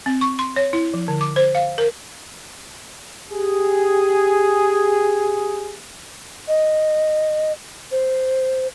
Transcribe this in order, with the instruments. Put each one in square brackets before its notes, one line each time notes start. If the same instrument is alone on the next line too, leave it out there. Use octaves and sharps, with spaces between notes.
[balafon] C4
C#6
C6
C#5
E4
F3
D3
D6
C5
F5
A#4
[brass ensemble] G4 G#4
[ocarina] D#5
C5